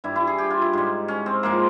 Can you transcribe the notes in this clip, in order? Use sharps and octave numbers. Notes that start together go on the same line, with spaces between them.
G2 G3 E4
E4
G#4
G4
F4
E4
G#2 G3
C#4
C4
G#2 F3 G#3 A#3